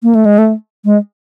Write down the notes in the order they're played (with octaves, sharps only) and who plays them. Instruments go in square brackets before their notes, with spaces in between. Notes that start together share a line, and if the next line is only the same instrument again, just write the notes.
[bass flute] A#3
A3
G#3
A3
G#3